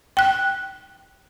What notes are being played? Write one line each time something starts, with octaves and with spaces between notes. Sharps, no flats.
G5 F#6